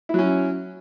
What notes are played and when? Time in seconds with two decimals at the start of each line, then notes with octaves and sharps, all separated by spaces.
0.09 E4
0.14 F#3
0.19 C#4